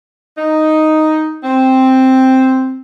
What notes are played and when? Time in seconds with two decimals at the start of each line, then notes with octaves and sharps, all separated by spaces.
0.37 D#4
1.43 C4